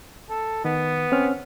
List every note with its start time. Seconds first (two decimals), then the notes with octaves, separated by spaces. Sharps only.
0.29 A4
0.65 D#3 B3
1.12 C4 C#4 F6